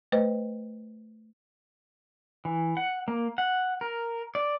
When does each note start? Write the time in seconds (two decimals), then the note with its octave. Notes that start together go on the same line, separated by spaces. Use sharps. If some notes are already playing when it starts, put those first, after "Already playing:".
0.12 A3 B4 C5 D#5
2.45 E3
2.77 F#5
3.08 A#3
3.38 F#5
3.81 A#4
4.35 D5